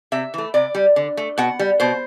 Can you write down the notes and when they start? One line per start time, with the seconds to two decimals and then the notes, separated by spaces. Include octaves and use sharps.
0.12 C3 E5
0.34 E3 A3
0.54 C3 D5
0.75 G3
0.96 D3
1.17 A3
1.38 B2 F#5
1.59 G3
1.80 B2 C5